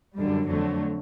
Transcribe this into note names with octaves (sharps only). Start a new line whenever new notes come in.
F#2 D3 G3
F2 D3 F#3 A3